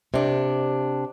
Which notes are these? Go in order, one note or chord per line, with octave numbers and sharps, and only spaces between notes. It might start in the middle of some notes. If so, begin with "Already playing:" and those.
C3 D4